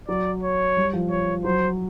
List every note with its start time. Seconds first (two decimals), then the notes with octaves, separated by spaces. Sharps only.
0.08 F#3 D5
0.43 C#5
0.77 G3
0.93 F3
1.11 C#5
1.44 F#3 C5